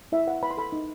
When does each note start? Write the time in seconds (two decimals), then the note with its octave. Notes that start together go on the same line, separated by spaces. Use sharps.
0.12 E4 E5
0.27 B4 F#5
0.43 B4 B5
0.51 C6
0.57 A4 B5
0.72 D#4